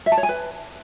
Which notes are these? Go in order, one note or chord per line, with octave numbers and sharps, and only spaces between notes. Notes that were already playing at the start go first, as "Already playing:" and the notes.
E5
A5
C#5
G#5
B4